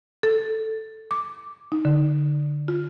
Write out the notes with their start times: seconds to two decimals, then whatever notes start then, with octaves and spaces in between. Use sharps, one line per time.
0.23 A4
1.11 D6
1.72 D#4
1.85 D3
2.68 F4